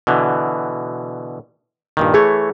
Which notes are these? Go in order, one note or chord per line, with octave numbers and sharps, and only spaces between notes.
B2 D3 E3
G2 A#2 D#3
E3 A3 G#4 C#5